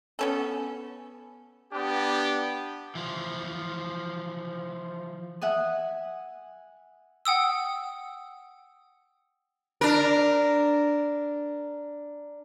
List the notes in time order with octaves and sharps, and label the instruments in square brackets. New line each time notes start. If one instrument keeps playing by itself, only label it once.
[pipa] B3 C#4 A4
[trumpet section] B3 D4 G4
[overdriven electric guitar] E3 F3
[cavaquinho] E5 F#5 G#5 D#6
[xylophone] F#5 G5 D#6 E6
[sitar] D4 A#4